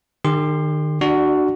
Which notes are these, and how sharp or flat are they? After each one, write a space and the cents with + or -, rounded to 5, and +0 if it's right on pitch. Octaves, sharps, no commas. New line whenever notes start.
D#3 -40 G4 +30 C6 +0
D4 +30 F#4 +10 D5 +0